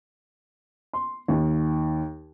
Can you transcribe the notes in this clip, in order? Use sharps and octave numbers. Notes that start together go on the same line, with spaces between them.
C6
D#2